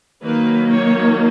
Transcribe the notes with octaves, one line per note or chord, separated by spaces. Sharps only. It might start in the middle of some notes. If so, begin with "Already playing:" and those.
D#3 F#3 A#3 B4
C#5